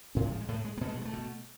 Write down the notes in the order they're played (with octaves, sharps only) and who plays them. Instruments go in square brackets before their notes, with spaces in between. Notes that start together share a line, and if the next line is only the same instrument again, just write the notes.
[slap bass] A2 C#4
G#3
F3
G#3
A2 A3
G#3
A#3
B2 A3
G#3
F#3
G#3
A3
B2